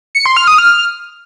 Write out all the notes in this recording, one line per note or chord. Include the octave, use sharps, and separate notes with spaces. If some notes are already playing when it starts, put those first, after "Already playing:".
C#7
C6
F6
D#6
F6